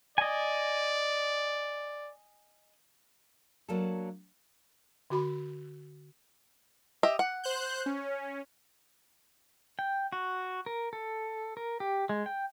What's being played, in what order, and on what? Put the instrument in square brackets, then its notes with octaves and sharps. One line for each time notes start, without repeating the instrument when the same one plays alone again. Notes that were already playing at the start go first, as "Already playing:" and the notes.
[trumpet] D5 [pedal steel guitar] D#5 G#5
[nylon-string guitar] F#3 A#3 D4 A4
[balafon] D3 F#4 B5
[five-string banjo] G4 D#5 E5
F#5
[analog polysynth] C5 F#6 G6
C#4
[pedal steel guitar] G5
F#4
A#4
A4
A#4
G4
G#3
G5